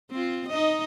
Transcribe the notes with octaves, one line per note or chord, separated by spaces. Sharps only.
C4 F4
D#4 D#5